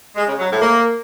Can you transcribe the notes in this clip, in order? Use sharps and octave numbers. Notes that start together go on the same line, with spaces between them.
G#3
C#3
F#3
A2
A#3